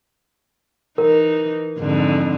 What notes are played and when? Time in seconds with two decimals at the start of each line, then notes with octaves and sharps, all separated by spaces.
0.98 E3 D#4 A#4
1.79 F2 G#2 D3